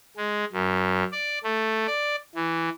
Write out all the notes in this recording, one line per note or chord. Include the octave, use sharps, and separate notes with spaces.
G#3
F#2
D5
A3
D5
E3